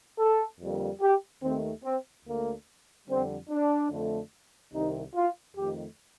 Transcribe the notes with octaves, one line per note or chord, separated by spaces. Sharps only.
A4
F2 D3 G3 A#3
G4
D#2 D#3 A3 C4
C4
D2 D3 A3 A#3
F2 D3 G3 C4
D4
F2 D3 A3
C2 C3 D#3 D#4
F4
F2 D#3 A3 G4